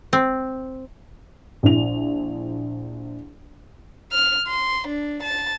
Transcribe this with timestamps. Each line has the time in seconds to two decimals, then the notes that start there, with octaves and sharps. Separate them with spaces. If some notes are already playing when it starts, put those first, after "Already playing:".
0.13 C4
1.63 A#1 E4 F7
4.12 F6
4.48 C6
4.87 D4
5.23 A5